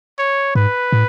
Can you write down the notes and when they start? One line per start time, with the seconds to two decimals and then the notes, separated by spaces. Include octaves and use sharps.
0.19 C#5
0.55 G#2 B4
0.92 A2